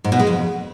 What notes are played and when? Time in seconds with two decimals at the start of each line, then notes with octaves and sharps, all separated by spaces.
0.04 G#2
0.12 B2
0.19 G#3
0.27 F2